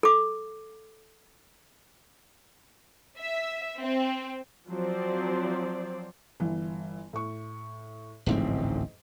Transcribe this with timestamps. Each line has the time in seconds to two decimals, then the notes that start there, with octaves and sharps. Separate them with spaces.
0.03 A4 D6
3.20 E5
3.82 C4
4.68 F3 F#3 C4 C5 D5
6.40 G1 E3
7.13 A2 C#6
8.26 D1 A1 F2 G#2 C4